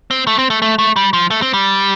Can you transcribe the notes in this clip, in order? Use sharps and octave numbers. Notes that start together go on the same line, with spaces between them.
C4
A3
C4
A3
A3
A3
G3
F3
A3
C4
G3